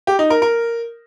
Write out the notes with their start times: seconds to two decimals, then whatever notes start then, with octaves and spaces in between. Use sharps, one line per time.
0.07 G4
0.19 D#4
0.30 A#4
0.42 A#4